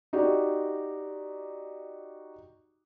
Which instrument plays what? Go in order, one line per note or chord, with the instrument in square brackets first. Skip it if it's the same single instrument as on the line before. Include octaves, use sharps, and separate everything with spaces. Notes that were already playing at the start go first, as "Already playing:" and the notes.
[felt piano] D#4 F#4 G4 D5